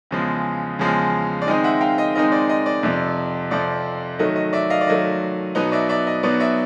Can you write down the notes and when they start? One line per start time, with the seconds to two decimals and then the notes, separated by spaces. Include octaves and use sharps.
0.11 E2 C#3 F3 G#3
0.79 E2 C#3 F3 G#3
1.42 D5
1.47 D#3 G#3 C4 D#4 D#5
1.64 E5 F#5
1.81 F5 G5
1.98 D#5
2.15 D#3 G#3 C4 D#4 D#5
2.32 D5
2.49 D#5
2.66 D5
2.83 F2 C3 F3
3.51 F2 C3 F3 D5
4.19 D#3 F#3 A3 D#5
4.36 D#5
4.53 D5 E5
4.70 D#5 F5
4.81 D5
4.87 D#3 F#3 A3 D#5
5.55 B2 F#3 B3 D#4 D#5
5.72 D5 E5
5.89 D5 E5
6.07 D#5
6.23 B2 F#3 B3 D#4 D5
6.40 D5 E5